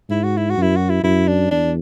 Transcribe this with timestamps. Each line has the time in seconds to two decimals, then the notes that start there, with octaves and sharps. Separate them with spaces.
0.09 G#2 E4
0.23 F#4
0.37 E4
0.50 F#4
0.57 F#2
0.62 E4
0.76 F#4
0.90 E4
1.03 F#2 E4
1.28 D4
1.51 E2 D4